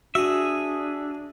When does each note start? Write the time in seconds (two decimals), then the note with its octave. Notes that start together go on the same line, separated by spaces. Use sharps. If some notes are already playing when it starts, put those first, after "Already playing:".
0.15 D4 F#4 G#4 E5